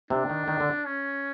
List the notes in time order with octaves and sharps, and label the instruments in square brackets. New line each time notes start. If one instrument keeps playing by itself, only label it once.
[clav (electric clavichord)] C3 [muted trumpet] D4
[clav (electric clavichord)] D#3
D#3
D3
[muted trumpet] C#4